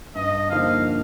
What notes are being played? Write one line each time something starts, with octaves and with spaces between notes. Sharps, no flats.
G2 D#5
D3 F3 A#3 D#4 F5